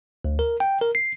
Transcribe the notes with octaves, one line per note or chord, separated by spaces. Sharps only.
D2
A#4
G5
A#4
C7